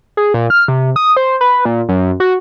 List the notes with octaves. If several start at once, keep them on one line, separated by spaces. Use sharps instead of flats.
G#4
A#2
F6
C3
D#6
C5
B4
A#2
F#2
F#4